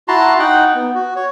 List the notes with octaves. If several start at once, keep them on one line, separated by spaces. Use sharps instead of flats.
E4 F#4 A5 A#5 C6
D#4 F#5 G5
B3
F#4
C#5